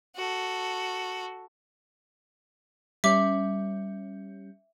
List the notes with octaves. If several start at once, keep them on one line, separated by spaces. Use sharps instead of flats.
F#4 A4
G3 C#4 E5 D6